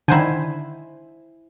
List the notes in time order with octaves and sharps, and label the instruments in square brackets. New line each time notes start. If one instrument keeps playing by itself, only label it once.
[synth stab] D3 D#3 [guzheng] E4 C5 G#5